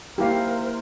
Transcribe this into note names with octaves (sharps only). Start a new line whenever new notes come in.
A#3 E4 G4 A#4 C5 F5